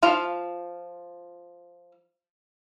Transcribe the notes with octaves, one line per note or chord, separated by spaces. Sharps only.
F3 F4 F5